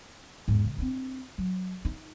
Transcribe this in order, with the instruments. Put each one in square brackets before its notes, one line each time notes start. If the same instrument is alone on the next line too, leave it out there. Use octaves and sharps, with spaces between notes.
[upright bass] E2 G#2
C#3
C4 D4
F#3
D#4